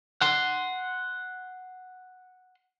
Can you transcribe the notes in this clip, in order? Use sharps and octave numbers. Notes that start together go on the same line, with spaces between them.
F#5 C6